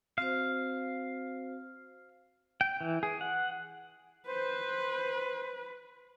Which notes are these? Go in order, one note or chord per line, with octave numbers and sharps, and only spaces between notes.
C4 F#4 C5 F5
G5
E3
G#4
F#5
B4 C5